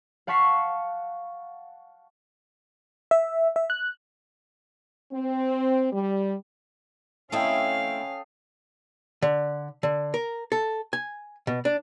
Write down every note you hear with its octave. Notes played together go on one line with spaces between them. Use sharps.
F5 F#5 A5 C#6 B6 C7
E5
E5
F#6
C4
G3
A3 C4 C#4 E4 A4 D#5 F5 G5
D3
D3
A#4
A4
G#5
B2
D4